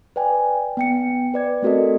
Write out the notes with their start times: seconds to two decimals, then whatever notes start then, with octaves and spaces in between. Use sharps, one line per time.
0.16 B4 D5 G5 G#5
0.77 B3 G5 C#7
1.34 B4 D5 G#6
1.62 A3 C4 F#4 A4 A#4 D#5